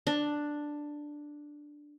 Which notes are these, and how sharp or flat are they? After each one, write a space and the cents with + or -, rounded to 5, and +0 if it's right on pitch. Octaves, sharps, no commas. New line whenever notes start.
D4 +5